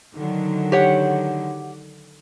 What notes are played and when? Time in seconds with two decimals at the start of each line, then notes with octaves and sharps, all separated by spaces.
0.13 D3 D#3 F#3
0.72 G4 C#5 F#5